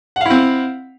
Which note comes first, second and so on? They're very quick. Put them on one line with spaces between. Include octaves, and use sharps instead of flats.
F#5 F5 E4 C4